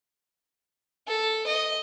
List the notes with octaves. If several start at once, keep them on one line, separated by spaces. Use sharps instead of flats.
A4
D#5